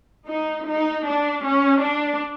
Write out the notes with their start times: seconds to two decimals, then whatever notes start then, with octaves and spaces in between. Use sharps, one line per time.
0.27 D#4
0.66 D#4
1.05 D4
1.44 C#4
1.82 D4